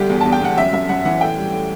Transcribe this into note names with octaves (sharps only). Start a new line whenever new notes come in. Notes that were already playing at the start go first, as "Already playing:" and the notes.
Already playing: D2 G3 G4
E2
E2 A5
G5
E2 F#5
F#2 E5
F#2 E5
F#2 F#5
E3 F#5
A2 G5
G3
A2